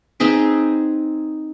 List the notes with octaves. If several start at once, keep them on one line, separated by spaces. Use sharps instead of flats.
C4 D#4 G#4 B4